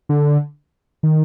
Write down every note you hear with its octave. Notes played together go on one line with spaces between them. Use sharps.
D3
D#3